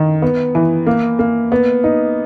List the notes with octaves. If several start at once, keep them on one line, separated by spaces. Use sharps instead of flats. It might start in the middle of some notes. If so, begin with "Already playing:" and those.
Already playing: D#3
B3
E3
A#3
A#3
B3
D#4